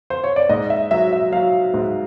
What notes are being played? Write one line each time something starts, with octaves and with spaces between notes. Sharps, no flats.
C5
C#5
D5
G#2 D#5
E5
F#3 E5
E5
F#3 F5
G#2